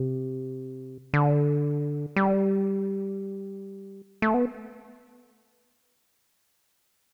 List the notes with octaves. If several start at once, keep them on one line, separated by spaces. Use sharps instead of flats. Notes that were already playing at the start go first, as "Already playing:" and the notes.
Already playing: C3
D3
G3
A3
B3